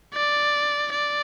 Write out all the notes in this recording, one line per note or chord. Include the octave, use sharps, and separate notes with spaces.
D5
D5